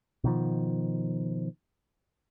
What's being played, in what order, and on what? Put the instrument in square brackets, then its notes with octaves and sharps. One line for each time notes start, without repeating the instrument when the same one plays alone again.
[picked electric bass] B2 D#3 F3